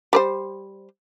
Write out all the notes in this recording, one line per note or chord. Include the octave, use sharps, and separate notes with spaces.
G3 B4 C5